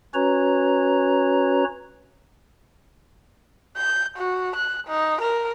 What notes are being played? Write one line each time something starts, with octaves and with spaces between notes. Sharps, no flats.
C#4 F#4 B4 C#5 A#5
G6
F#4
F#6
D#4
A#4